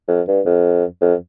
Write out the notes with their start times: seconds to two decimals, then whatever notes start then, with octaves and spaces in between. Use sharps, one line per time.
0.08 F2
0.28 G2
0.46 F2
1.01 F2